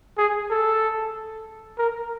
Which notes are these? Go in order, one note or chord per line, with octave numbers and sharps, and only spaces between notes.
G#4
A4
A#4